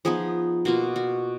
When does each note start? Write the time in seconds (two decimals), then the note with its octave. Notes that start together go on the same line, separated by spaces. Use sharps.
0.05 F3 B3 D#4 G#4
0.65 B2 A#3 F4 F#4
0.96 F#4